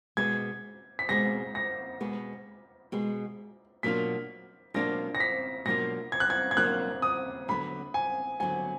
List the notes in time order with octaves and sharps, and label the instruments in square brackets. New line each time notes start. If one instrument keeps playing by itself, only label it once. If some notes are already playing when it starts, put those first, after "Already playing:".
[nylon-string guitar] B2 G#3 B3 [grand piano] G#6
[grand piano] B6
[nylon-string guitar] B2 G#3 B3 [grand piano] A#6
[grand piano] A#6
[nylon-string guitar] B2 G#3 B3
B2 G#3 B3
[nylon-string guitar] B2 F#3 A#3 D4 F4 [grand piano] B6
[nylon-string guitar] B2 F#3 A#3 D4 F4 [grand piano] A#6
[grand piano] A#6
B6
[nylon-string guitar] B2 F#3 A#3 D4 F4 [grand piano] A#6
[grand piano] G#6
F#6
G#6
G#6
[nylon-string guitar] B2 F#3 A#3 D4 F4 [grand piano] F#6
[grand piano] D#6
[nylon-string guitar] D3 F#3 B3 [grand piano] B5
[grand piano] G#5
[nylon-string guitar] D3 F#3 B3 [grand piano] G#5